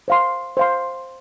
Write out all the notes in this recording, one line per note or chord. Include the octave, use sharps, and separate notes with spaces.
C5 F5 C6
C5 F5 C6